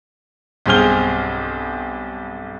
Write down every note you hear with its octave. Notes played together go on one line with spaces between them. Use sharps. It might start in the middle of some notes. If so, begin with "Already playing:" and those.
B1 G2 C4 G#4 F6 G7